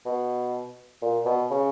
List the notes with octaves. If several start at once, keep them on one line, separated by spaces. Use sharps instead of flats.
B2
A#2
B2
C#3